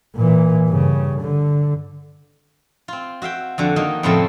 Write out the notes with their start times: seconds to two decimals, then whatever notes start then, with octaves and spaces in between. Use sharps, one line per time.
0.16 A#2 E3
0.67 G2 C#3
1.21 D3
2.88 C4 F4
3.22 F#4 E5 F5 G5
3.58 F2 D3 F#4
3.76 D#3 A#3 D#4
4.03 F2 A2 C#3 F3 A3 C4